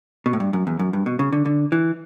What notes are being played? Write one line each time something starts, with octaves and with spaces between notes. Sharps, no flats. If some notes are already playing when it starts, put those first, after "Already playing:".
B2
A2
G2
F#2
E2
F#2
G2
B2
C#3
D3
D3
E3